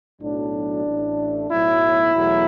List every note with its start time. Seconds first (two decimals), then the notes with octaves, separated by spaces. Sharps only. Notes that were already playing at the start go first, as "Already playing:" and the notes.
0.21 B1 A2 F#3 A3 D4
0.86 A1 A2 A3
1.50 B1 A2 F#3 E4
2.14 E2 B2 F#3 A3